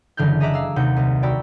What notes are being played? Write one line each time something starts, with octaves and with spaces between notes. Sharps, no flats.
F#1 D3 E3 F6 G6
G#4 D#5 E5 A#5 D6 F#6
F5 E6
D#2 C3 F#5 G6
C2
F#4 D5 G5 A#5 B5 E6